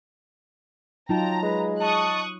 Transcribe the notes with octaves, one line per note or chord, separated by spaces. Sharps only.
F#3 D#4 F4 G5 A5 A#5
G#3 B4
D#5 A5 C#6 D#6 F#6